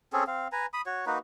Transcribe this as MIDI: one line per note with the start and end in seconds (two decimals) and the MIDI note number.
0.13 0.24 60
0.13 0.24 61
0.13 0.24 68
0.13 0.24 69
0.27 0.48 60
0.27 0.48 77
0.52 0.66 71
0.52 0.66 80
0.52 0.66 82
0.74 0.81 83
0.74 0.81 87
0.86 1.05 66
0.86 1.05 73
1.06 1.18 58
1.06 1.18 63
1.06 1.18 66
1.06 1.18 71